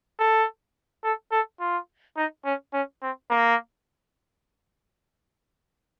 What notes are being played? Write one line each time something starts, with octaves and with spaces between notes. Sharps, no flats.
A4
A4
A4
F4
D#4
C#4
C#4
C4
A#3